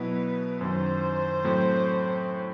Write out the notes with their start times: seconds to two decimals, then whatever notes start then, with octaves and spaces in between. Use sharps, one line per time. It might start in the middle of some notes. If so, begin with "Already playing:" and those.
Already playing: B2 F#3 B3 E4 B4
0.61 F#2 D#3 F#3 C5
1.44 A2 F#3 A3 C4